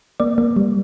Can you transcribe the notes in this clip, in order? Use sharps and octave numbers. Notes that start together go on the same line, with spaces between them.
A#3 D5
A#3
G3